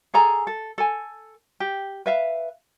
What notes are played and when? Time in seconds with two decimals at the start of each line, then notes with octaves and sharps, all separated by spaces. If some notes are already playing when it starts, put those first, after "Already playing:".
0.14 G#4 A4 G#5 A#5
0.47 A4
0.78 A4 G#5
1.60 G4
2.06 B4 E5 F5